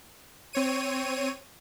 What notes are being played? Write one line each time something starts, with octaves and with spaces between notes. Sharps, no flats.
C4 C#5 D#7